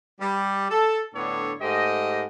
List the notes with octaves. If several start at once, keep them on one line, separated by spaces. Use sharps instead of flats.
G3
A4
A2 D3 B3 D4 A4 C#5
G#2 A3 G4 C5 D#5